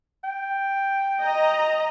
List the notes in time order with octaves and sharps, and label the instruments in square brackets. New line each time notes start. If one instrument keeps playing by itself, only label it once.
[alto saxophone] G5
[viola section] D#5 A#5